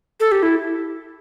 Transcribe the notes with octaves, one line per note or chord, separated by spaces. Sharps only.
A4
G4
E4